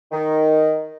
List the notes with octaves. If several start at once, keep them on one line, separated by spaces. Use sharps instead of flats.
D#3